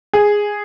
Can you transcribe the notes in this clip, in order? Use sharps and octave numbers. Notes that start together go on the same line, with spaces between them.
G#4